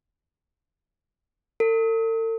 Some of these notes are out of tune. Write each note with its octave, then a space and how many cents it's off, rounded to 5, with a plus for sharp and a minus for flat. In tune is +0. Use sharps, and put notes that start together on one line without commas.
A4 +45